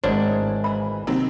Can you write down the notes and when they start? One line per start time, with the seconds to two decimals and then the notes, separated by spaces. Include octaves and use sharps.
0.04 G#1 F2 G#2 D4 E4 C5 C#5
0.64 E3 B5
1.07 C3 D#3 F#3 C4